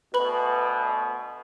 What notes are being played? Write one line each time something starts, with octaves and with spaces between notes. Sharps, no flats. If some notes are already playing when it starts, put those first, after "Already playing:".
D2 B2 B4 B5 F#7